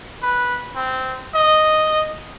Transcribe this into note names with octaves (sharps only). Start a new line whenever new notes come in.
B4
C4
D#5